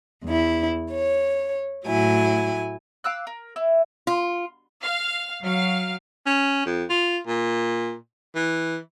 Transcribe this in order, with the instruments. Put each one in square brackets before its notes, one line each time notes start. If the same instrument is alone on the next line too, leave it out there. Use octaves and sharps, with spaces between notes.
[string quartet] E2 E4
C#5
A2 F#3 E4 G#5
[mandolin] F5 D6 E6 F#6
A#4
E4
[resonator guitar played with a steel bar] F4
[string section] F5
F#3 F5
[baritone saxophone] C#4
F2
F4
A#2
E3